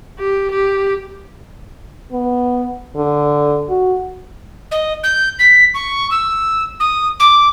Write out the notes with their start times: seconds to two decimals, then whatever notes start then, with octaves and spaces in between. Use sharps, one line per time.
0.19 G4
0.52 G4
2.12 B3
2.96 D3
3.69 F#4
4.71 D#5
5.04 G6
5.39 B6
5.74 C#6
6.11 E6
6.80 D#6
7.20 D6